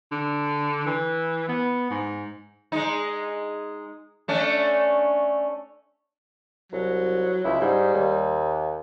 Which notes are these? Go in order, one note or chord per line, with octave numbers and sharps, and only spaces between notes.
D3
E3
B3
G#2
G#3 D#4
A3 C#4 D4
C2 F#3
C#2 E4
G#2 G3
D#2